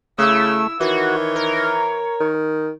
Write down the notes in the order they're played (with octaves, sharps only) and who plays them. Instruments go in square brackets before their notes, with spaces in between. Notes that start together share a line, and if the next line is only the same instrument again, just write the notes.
[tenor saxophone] C#3 [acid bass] A3 [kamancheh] E4 E6
[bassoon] D#3 [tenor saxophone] E3 [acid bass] F#4 [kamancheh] C#5
[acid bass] A#4
[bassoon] D#3